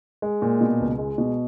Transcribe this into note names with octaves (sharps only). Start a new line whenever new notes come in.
G#3
A#2
B2
C#2
G#3
B2